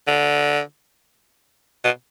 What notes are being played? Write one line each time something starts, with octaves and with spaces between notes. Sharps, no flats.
D3
B2